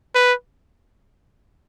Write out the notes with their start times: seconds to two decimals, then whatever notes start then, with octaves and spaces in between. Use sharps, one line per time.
0.15 B4